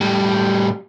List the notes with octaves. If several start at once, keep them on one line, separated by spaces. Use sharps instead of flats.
A2 G3